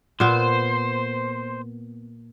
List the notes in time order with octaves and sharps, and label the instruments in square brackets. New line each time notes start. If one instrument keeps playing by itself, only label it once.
[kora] A#2 B3 [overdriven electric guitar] C5